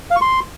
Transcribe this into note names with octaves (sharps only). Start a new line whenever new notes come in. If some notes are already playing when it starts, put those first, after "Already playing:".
F5
C#6
C6